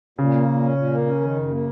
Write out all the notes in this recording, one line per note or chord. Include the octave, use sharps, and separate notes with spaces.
A#2 C#3
A#3
A#2
C#4
A#2
A#3
C#4
D#3
F#2
A#3